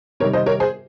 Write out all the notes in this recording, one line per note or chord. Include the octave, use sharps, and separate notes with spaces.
C3 D#3 G3 A#4 C#5
C5 D#5
A#4 C#5
G#4 C5